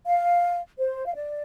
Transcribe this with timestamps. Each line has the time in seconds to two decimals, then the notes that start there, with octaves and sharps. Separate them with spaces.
0.06 F5
0.78 C5
1.06 F5
1.15 D5